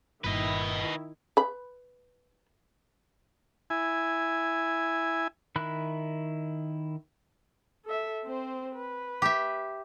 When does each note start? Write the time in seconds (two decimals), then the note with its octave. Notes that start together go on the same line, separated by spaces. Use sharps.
0.24 G1 G2 A#2 D#3 E4 B4 D#5
1.37 B4 B5
3.70 E4 G#5
5.56 D#3 E4 B5 F#6
7.85 A4 E5
8.25 C4 C5
8.75 B4
9.22 G4 E5